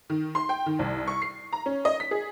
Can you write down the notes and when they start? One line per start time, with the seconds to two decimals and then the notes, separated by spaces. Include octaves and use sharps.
0.10 D#3
0.35 C6
0.49 G5
0.66 D#3
0.79 C2
1.08 C#6
1.22 C7
1.53 A#5
1.66 C#4
1.85 D#5
2.00 B6
2.11 G#4